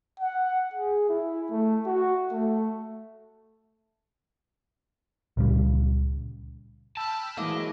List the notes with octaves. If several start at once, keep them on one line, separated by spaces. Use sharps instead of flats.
F#5
G#4
E4
A3
F#4
A3
C#2 A#2 C#3 G3
G5 A5 B5 E6 F6
E3 F#3 G#3 A#3 E4 D#5 D6